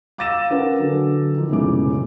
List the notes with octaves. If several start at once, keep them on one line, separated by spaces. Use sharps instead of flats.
F5 D6 E6 A6 A#6 E7
C#4 A#4 B4 F#5
D3 F#3 D4
D#3 F3
F1 B1 A2 C#3 G#3 D6